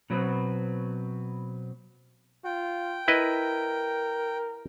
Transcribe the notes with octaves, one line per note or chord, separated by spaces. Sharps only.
B2 F#3 B3 C4
F4 G5
E4 A#4 B4 D#5